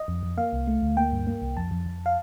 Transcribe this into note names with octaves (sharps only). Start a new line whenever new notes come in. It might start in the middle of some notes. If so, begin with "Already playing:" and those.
Already playing: D#5
F2
F2
A#3 F5
C2
A3
D2
A#3 G5
G2
A#3
C2
F2 A5
F2
F2
F5